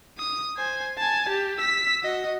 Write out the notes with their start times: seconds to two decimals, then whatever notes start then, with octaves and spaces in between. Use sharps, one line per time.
0.18 D#6
0.57 C5 G#5
0.97 G#5 A5
1.29 G4
1.58 E6 B6
2.03 F#4 D#5